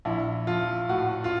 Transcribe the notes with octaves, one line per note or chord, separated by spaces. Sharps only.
A#1 E4
F3 F4
A2 F#4
F4